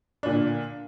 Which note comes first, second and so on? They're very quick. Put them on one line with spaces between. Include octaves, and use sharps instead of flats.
D4 A#2 D3